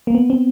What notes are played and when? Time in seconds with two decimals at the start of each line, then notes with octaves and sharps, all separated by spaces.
0.07 A#3
0.15 B3
0.30 C4